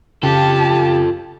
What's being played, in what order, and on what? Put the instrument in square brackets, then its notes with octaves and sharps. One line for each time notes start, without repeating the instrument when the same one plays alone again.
[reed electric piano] C#3 [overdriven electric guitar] F4 A4 [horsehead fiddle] G4 A5